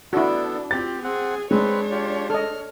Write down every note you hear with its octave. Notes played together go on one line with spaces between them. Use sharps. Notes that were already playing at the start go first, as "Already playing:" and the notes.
B3 D4 E4 F#4 A4
C4 F4 G4 A6
C4 G#4 F#5
G#3 C4 D4 B4 C#5
F4 G4
A4 D#5 F6